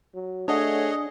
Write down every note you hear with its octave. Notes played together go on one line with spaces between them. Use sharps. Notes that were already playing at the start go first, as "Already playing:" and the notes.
F#3
A3 D4 G#4 C#5 D#5 F#5